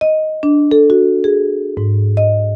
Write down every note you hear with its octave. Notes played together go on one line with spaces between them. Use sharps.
D#5
D4
A4
F#4
G#4
G#2
D#5